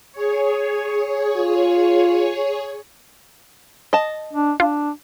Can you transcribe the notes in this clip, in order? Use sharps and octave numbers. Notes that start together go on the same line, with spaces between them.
G#4 C#5
F4
D#5 A5
D4
D4 F4